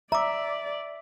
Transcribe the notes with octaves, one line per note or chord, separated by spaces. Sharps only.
D5 E5 A#5 D6